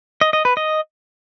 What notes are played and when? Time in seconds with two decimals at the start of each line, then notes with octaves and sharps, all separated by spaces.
0.21 D#5
0.33 D#5
0.45 B4
0.57 D#5